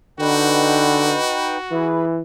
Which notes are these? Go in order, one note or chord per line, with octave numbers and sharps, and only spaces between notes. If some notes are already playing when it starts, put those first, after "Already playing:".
D3 D#4 F#4 B4 G5
E3 G#4 B4